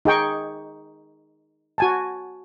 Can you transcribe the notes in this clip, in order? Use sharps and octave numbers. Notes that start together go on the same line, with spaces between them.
D#4 G#4 G5 C#6
F#4 G#5 A5